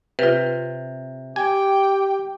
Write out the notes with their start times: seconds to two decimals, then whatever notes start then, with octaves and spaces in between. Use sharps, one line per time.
0.19 C3 F4 B4
1.36 G4 G5 G#5